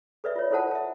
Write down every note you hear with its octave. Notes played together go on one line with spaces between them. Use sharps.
A4 B4 D5 E5
F4 C#5
E4 F4 A4 C5 F#5 A5
E5 A5